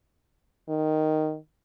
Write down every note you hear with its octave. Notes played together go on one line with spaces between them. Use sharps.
D#3